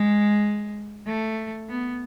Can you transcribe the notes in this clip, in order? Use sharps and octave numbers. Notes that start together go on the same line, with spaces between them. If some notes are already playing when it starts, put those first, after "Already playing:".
Already playing: G#3
A3
B3